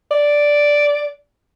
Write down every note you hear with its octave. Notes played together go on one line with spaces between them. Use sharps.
D5